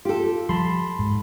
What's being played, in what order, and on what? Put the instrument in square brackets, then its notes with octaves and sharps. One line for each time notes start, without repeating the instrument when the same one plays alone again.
[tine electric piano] F4 [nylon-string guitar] G4 A4
[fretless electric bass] F3 G3 [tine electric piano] A5 B5 C6
[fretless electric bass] G#2